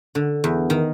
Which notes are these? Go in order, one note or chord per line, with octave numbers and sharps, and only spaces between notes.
D3
E2
D#3